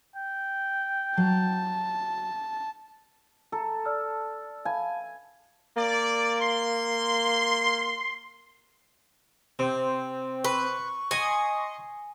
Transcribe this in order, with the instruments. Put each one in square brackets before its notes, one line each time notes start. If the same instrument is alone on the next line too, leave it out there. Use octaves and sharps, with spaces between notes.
[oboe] G5
[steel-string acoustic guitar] F#3 A#5 [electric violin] A5
[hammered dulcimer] A4 [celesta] A#5
[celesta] D5 E6 F6
[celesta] F5 A5 B5 [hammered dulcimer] G#5
[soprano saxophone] A#3 [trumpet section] D5
[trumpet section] C6
[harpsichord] C3 [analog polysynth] C4
[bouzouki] B4 [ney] C#6
[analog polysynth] D#5 C6 [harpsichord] F#5 D#6 [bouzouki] G#5